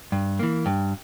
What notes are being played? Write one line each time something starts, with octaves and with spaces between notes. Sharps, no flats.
G2
E3 A#3
G2